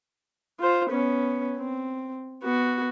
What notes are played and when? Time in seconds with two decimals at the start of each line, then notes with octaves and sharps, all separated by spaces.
0.61 F4 C5
0.90 B3 C#4
1.57 C4
2.43 B3 F#4